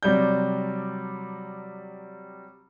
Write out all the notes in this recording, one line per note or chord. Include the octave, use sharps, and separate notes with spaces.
C3 F#3 G3 D5 G6